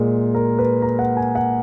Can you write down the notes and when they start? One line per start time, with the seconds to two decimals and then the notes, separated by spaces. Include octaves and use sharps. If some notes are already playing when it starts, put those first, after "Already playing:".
Already playing: A#2 G#3
0.35 A#4
0.59 B4
0.82 A#5
0.99 F#5
1.17 G#5
1.35 F#5